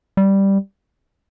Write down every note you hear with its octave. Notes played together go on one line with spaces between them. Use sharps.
G3